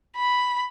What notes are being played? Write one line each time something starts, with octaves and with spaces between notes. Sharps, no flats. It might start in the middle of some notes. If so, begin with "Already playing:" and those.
B5